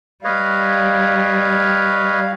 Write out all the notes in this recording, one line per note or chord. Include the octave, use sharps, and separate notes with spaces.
G3 B4 C#5 D#5 F5